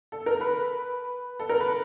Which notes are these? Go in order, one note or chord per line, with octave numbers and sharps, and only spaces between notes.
A4
A#4
B4
A4
A#4
B4